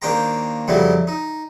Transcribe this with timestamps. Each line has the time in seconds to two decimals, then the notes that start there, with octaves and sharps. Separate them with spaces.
0.02 D#2 A#3 D4 C5 G5 A#5
0.68 F2 C#3 F#3 G3 E4
1.07 D#4